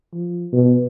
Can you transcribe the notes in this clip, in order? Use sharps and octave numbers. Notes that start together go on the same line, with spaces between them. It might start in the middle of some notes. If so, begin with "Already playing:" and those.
F3
B2